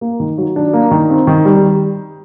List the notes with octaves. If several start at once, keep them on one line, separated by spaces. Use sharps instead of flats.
A#3
D#3
F#3
D4
A#3
D#3
C4
D#3
G3